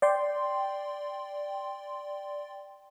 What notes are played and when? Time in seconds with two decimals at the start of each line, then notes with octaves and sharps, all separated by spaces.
0.02 D5 G5 C6